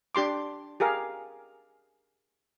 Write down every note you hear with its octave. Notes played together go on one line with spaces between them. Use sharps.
D4 G4 C6 D6
G4 G#4 A#4 F5